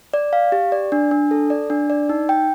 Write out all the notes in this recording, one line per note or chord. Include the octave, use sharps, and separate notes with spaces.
D5
F5
G4
D5
D4
D4
A4
D5
D4
D5
D#4
G5